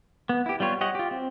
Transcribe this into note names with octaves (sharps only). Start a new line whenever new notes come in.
B3
E4 G4
G3 B3 F4 C#5
G4 C#5 D#5 F#5
F4 G4
C4